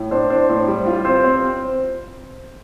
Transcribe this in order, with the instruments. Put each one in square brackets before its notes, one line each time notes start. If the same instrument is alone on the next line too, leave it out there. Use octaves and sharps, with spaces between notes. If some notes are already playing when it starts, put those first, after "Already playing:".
Already playing: [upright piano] A2
[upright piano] D4 [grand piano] C5
[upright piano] D4 [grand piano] C5
[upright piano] A2
G3
F4
[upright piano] C4 [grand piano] C5
[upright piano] C4